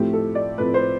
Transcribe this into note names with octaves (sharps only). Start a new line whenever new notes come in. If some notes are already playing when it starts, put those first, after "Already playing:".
Already playing: A2 F3 A3 C4 G4
A4
D5
A2 F3 A3 C4 B4
C5